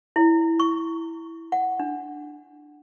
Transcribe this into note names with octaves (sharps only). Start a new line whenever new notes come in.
E4
C#6
F#5
D4